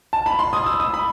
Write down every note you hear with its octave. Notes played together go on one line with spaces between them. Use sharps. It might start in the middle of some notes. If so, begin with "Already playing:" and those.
A5
B5
C6
D#6
E6
D#6
B5